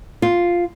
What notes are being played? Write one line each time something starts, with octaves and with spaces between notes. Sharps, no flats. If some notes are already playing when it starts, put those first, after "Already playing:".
F4